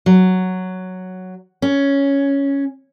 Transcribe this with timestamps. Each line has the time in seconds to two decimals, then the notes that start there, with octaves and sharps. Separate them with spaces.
0.06 F#3
1.62 C#4